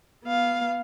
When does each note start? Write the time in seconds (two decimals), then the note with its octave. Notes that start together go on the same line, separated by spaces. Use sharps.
0.25 B3 F5